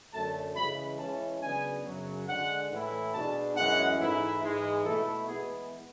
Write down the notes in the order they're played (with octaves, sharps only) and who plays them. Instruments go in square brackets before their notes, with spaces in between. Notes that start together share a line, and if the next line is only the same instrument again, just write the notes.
[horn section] F#2 D3 A3 A5
C#3 E3 G#3 B5
E3 G#3 C#4 E4 A5
C#3 F#3 B3 D4 G#5
F#2 C#3 F#3
D3 G#3 D4 F#5
A2 E3 A3 E4
B2 G#3 D4 A5
F#2 E3 G#3 C#4 E4 F#5
G#2 E3 A3 E4
G#2 E3 G#3
B2 A3 E4 A4
E3 G#3 B3 E4 G#4